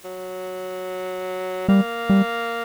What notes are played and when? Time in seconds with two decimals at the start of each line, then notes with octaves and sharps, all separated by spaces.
0.04 F#3
1.68 G3 A#3
2.10 G3